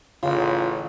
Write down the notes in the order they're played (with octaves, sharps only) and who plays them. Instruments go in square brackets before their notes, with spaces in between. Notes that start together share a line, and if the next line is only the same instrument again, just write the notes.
[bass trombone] A1 [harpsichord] C#3 [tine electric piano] F4